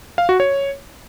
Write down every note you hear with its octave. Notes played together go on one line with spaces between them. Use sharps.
F5
F#4
C#5